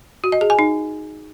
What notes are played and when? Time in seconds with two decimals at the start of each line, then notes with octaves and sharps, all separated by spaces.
0.24 F#4
0.32 D#5
0.41 G#4
0.50 G#5
0.59 D#4